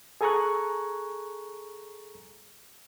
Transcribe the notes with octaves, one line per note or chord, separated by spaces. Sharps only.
G#4 A4 G#5 A#5 C#6 F#6